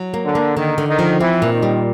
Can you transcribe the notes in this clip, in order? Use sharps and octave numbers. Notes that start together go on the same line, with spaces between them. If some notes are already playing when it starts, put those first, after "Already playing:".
Already playing: F#3
A#3
D3
A#3
D3 D#3
D3
D#3
F3
E3 C4
A#2
D#3
G3